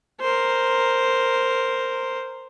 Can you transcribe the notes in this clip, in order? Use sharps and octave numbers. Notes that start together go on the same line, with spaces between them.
A#4 C5